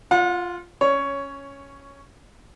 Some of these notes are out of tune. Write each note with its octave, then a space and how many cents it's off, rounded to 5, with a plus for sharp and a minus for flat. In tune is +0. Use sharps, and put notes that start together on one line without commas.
F4 +0 F#5 -40
C#4 +0 C#5 +10